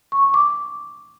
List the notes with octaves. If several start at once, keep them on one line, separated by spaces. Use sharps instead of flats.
C#6
C#6
D6